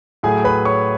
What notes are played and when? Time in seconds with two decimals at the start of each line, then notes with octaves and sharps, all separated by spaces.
0.23 A2 F#3 A3 G#4 G#5
0.44 B4 B5
0.65 C#5 C#6